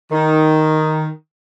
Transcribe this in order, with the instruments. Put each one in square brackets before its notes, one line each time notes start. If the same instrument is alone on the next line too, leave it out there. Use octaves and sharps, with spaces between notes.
[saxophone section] D#3